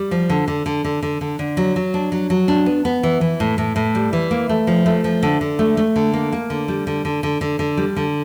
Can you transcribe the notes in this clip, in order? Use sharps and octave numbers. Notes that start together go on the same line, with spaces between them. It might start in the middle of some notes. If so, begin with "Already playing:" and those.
Already playing: G3
F3
D3
D3
D3
D3
D3
D3
D3
F#3
F#3
D4
F#3
F#3
D4
B3
B3
E3
E3
A2
A2
A2
G3
E3
A#3
A3
F3
A3
F3
D3
D3
A3
A3
D3
A#3
A#3
D3
G3
D3
D3
D3
D3
D3
G3
D3